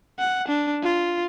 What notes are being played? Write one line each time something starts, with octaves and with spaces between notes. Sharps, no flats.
F#5
D4
F4